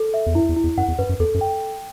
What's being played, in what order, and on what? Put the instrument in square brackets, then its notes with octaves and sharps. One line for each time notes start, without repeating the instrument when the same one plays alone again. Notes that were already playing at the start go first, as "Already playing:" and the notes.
Already playing: [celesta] A4
E5
[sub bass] E2
[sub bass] F#2 [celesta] E4
[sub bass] E2
[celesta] E4
[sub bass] E2
[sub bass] F#2 [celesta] F#5
[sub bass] E2
[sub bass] F#2 [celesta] B4
[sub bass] F#2
[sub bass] E2 [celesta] A4
[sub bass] F#2
[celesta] G5